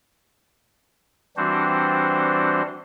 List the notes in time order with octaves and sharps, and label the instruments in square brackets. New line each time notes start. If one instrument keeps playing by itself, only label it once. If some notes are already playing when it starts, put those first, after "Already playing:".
[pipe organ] E3 G3 C4 D4 F#4 C5